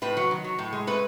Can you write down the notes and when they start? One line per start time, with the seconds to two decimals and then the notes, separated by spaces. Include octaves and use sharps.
0.02 A2 B4
0.17 F#3
0.31 D#3
0.44 F#3
0.59 A2
0.73 G#3
0.87 A3 B4